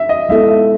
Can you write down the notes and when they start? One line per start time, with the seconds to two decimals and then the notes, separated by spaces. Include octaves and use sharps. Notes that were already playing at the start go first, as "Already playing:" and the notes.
Already playing: E5
0.09 D#5
0.29 G#3 B3 E4 A4 E5
0.49 E5